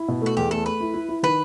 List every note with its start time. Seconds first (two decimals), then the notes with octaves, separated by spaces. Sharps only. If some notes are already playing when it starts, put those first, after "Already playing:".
Already playing: E4
0.08 B2
0.22 A3 F#4
0.37 E2 G4
0.51 A3 A4
0.65 A3 B4
0.80 E4
0.94 E4
1.09 E4
1.23 D#3 B4